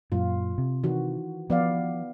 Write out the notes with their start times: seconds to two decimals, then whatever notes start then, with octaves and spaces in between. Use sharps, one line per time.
0.12 F#2 A#2 F4
0.58 C3
0.83 D#3 E3 F#4
1.50 F3 B3 D5 F5